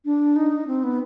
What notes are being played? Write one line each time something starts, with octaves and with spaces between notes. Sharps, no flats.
D4
D#4
C4
B3